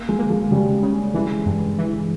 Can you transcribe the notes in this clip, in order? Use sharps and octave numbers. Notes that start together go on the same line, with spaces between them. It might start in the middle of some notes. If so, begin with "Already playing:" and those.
Already playing: A#3
G#3
A#3
G#3
C#3 G3
C#3
E3 G#3
G2
E3